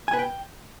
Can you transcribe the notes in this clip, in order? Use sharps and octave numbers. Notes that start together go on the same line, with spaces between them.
G#5
B4
G5